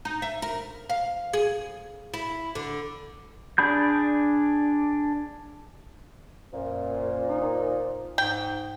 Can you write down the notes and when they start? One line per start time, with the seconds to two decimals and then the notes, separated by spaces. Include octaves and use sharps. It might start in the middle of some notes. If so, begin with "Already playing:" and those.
0.05 D#4
0.22 E5
0.42 A#4
0.90 F5
1.33 G#4
2.14 E4
2.55 D3
3.58 D4 G#4 B5 G6
6.53 F#2 A#2 F3
7.29 D#4
8.18 G#2 G5